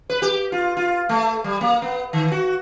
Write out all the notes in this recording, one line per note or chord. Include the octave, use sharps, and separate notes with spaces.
B4
G4
F4
F4
A3
G3
A#3
B3
D#3
F#4